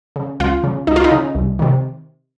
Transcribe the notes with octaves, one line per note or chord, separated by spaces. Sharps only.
C#3
C#2 F4
C#3
C#2 D#4
F4
D#4
C#3
C2
C3 D#3